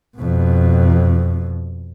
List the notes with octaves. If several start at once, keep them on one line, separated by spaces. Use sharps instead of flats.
F2 B2